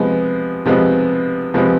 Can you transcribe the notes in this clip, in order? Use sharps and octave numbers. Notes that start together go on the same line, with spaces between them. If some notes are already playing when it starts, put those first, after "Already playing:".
Already playing: C3 F3 G#3 B3
C3 F3 G#3 B3
C3 F3 G#3 B3